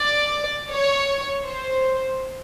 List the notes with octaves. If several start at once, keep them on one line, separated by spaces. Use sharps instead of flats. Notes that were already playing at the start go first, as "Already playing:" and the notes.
Already playing: D5
C#5
C5